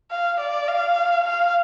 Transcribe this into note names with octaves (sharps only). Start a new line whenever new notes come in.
F5
D5
F5
F5